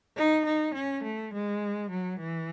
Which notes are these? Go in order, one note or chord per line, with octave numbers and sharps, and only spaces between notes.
D#4
D#4
C#4
A3
G#3
F#3
E3